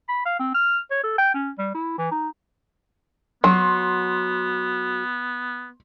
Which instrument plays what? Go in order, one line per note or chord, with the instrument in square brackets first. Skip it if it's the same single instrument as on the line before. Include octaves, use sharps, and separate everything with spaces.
[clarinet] B5
F5
C4
F6
C#5
A4
G5
C#4
G3
E4
E3
D#4
[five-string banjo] F#3 [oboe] B3 [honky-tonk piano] C6